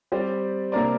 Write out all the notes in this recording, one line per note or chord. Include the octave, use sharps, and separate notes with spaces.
G3 C4 G4 D5
C3 A#3 D4 A#4 D5